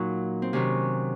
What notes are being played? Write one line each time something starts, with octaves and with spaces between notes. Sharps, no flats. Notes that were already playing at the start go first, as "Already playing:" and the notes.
Already playing: A#2 F#3 D#4 F#4
C4
C3 D#3 F#3 C#4